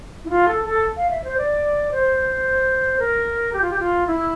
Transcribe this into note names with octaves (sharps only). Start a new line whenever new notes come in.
E4
F4
A4
A4
F5
E5
C5
D5
C5
A#4
G4
F4
G4
F4
E4